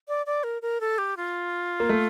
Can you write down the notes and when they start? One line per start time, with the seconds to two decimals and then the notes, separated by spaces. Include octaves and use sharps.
0.08 D5
0.26 D5
0.44 A#4
0.62 A#4
0.81 A4
0.98 G4
1.17 F4
1.80 A#3
1.89 A3